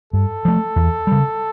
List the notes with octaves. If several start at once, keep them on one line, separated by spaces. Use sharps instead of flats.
G2 A4
F3 A3
E2
C#3 G3